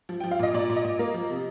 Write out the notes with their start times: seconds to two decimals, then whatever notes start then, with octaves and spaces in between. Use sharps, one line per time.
0.09 F3
0.20 F3 G5
0.31 F5
0.39 A#2 D#5
0.54 A#2 D5
0.70 A#2
0.76 D#5
0.84 A#2
0.99 A#3
1.14 F3
1.30 C3